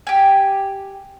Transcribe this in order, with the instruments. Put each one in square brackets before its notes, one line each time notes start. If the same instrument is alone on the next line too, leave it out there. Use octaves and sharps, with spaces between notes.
[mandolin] G4 G#5